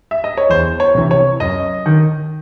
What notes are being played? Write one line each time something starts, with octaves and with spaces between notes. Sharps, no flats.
E5
D#5
C#5
E2 C5
C#5
C3 E3
C#5
F#2 D#5
D#3